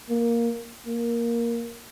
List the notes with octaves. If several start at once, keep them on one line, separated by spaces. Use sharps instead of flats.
A#3
A#3